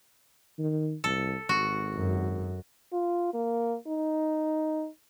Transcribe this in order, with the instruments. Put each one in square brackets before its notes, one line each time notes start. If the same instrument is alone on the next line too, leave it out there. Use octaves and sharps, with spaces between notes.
[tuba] D#3
[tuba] C2 [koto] A4
[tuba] G#1 [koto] F#4
[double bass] F#2
[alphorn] F4
A#3
D#4